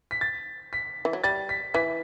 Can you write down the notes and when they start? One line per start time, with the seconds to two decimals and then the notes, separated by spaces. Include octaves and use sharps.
0.11 B6
0.21 A6
0.73 B6
1.05 E3
1.13 F#3
1.24 G3 A6
1.49 B6
1.74 E3 B6